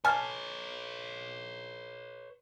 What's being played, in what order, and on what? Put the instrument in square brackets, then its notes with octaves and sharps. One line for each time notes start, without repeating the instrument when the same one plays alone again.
[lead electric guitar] B4 C#5 [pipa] G#5 [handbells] A5 F6